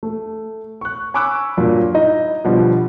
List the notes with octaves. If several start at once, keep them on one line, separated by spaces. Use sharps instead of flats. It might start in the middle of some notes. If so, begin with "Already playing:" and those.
A3
C#6 F#6
G#5 B5 C#6 D6 E6 F#6
G2 A#2 F#3
D#4 E4 D#5
B2 D3 F3 G3